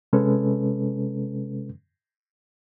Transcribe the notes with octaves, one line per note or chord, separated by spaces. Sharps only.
C3 G#3 C#4 A4 B4